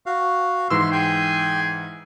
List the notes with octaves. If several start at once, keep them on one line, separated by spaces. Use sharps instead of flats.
F#4 F5
G#2 E3 C6 E6
G#4 G5